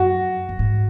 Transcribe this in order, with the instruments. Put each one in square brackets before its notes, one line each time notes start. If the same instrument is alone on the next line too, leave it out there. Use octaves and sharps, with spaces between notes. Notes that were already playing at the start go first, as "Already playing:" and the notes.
Already playing: [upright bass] F#2 [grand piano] F#4
[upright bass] F#2
G#2